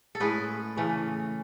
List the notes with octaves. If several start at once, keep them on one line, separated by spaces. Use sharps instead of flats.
A4
A2 G#3 C#4 G#4 B4
C#3 E3 A3 C#4